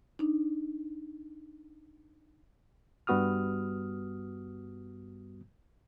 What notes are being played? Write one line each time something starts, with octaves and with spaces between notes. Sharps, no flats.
D4 D#4
G2 G3 B3 F#4 D#6 F6